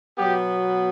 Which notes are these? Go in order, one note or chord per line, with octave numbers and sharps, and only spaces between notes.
B2 F#3 B3 G4